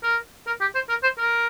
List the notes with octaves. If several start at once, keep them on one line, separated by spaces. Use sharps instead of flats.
A#4
A#4
G4
C5
A#4
C5
A#4